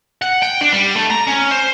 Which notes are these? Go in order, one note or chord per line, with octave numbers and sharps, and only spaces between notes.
F#5
G5
D4
G3
A3
A#5
C#4
C5